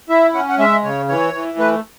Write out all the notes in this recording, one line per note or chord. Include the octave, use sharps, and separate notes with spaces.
E4 E5
C#4 F#5
F#5
G#3 E5
C#3 C#5
E3 C#5
E3
A3 B4